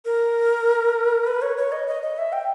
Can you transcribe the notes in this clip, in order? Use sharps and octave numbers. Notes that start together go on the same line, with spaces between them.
A#4
B4
C#5
C#5
D#5
D#5
D#5
E5
G5